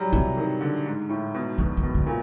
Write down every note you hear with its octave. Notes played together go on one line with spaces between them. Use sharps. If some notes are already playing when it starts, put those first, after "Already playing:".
Already playing: F#3 G3
C3 E3
D#3
D3
G#2
A2
B2
B2 D3
D#3
B2
D3
A#2